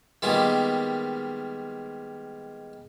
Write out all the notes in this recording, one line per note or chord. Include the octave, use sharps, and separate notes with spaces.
D#3 G3 G#3 A#3 B3 F4